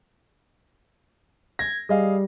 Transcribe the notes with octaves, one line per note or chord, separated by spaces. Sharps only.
G#6 A#6
G3 G#4 D#5 F5